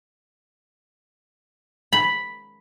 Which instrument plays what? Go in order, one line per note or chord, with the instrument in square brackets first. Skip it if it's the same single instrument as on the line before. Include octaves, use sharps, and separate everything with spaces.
[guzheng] B5